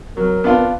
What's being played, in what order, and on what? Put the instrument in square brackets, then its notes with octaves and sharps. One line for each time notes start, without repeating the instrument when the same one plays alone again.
[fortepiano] F#3 [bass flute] A#4
[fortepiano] B3 D4 F4